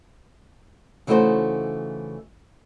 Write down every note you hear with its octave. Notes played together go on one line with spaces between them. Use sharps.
C#3 E3 A3 D#4 F#4 C5